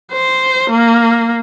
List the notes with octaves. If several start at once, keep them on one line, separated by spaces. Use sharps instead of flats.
C5
A#3